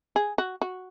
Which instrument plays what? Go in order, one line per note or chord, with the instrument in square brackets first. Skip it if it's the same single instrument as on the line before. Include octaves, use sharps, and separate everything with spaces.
[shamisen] G#4
F#4
F#4